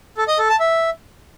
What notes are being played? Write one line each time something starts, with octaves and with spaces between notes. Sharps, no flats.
A4
D#5
A4
A5
E5